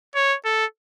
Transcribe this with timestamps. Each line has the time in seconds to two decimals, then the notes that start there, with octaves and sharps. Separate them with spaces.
0.15 C#5
0.45 A4